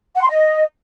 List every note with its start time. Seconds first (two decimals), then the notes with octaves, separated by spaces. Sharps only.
0.15 F#5
0.22 C6
0.29 D#5